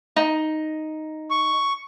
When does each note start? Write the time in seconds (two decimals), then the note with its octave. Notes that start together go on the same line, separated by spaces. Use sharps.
0.16 D#4
1.31 C#6